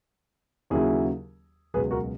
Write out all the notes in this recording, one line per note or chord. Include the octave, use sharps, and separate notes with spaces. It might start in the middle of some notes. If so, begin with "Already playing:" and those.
D#2 C#3 F#3 E4 G#4
C#2 B2 F#3 G#4 B4
F#4 A#4